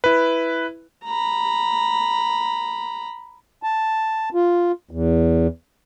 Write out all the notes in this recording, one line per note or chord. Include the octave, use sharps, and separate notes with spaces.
E4 B4
A#5 B5
A5
F4
E2